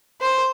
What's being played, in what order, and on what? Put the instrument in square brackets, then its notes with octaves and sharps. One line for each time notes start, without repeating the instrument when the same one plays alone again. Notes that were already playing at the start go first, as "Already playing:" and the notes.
[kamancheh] C5